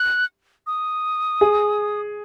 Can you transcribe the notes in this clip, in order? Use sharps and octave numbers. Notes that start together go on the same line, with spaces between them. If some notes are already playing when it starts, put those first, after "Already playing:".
Already playing: F#6
D#6
G#4